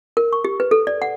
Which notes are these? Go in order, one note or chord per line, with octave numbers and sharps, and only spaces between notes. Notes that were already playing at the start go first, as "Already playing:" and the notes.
A#4
C#6
G4
B4
A4
D5
F#5